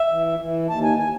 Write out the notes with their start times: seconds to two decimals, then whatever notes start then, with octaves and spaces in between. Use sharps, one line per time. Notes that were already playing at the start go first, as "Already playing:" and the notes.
Already playing: E5
0.11 E3
0.39 E3
0.69 D#2 A5
0.83 G#5
0.99 G#5